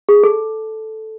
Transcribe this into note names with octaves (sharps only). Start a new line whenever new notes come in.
G#4
A4